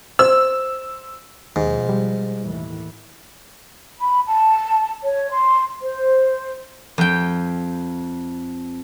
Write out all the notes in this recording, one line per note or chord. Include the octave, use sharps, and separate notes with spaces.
C5 E6
D#2 G#2 B2 F3
G3
D#2 A2 E3
B5
A5
C#5
C6
C5
F2 G5